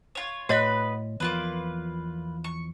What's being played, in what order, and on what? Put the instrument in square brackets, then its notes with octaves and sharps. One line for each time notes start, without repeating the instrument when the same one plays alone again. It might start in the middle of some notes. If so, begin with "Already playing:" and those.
[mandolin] F4 C#5
[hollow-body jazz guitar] A2 [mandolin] B3 B4 B5 [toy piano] F#4 C#5 D#5
[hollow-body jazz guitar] E2 F3 [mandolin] A#3 F4 B4
[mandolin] C#6